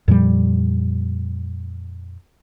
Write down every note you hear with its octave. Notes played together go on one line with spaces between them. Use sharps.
F2 A#2 F3 G3